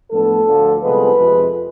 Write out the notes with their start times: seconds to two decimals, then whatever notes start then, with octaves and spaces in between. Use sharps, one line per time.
0.11 A2 F3 B3 D4 A4
0.46 D2 D3 F3
0.83 C2 C3 F3 G#3 B3 B4
1.18 F2 C3 G#3